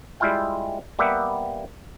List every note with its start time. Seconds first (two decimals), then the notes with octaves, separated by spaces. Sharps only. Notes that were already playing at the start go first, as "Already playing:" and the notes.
0.20 G3 G#3 E4 F4 F5 G5
0.99 G3 A#3 B3 G4 E5 F#5